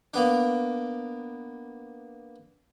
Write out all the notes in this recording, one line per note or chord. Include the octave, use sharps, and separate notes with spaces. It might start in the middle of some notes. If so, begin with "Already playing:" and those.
A#3 B3 D4